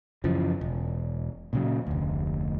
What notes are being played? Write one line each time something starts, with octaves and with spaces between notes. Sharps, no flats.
F#2 C#3 E3 F3
E1
A#2 C#3 F#3
F1 D2